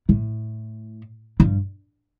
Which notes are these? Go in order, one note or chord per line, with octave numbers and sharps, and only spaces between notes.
A2
G2